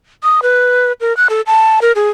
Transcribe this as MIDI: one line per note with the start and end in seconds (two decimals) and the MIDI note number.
0.23 0.40 87
0.42 0.92 71
1.01 1.15 70
1.17 1.27 90
1.30 1.41 69
1.47 1.79 81
1.82 1.92 70
1.95 2.09 68